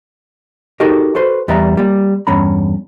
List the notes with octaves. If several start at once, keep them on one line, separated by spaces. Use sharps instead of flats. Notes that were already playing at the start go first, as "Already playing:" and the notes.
D#4 F#4 G4 A4 A#4 D#5
F#4 A4 B4 C5
E2 G3 B4 D#5 E5 A#5
G3 A#3
E2 G2 C#4 A#5 B5